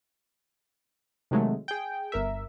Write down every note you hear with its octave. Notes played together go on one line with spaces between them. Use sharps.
C3 D#3 F#3 G#3 A3
G#4 G5
G1 A#4 E5